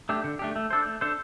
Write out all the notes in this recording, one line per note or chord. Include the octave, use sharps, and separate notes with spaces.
A3 D4 G4
D3
A3 D4 G4
A3
D4 A4 C5
A3
D4 A4 C5